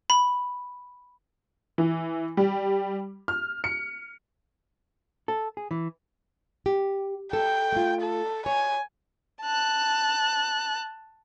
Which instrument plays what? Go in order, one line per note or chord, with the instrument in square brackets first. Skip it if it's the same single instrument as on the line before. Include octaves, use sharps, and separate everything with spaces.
[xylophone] B5
[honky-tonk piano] E3
G3
F6
C#7
[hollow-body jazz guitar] A4
G#4
E3
[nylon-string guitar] G4
[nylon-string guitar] A4 [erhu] G5
[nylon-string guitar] A3 F4
[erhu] A4
[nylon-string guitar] C#5 [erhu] G#5
[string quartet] A5 F#6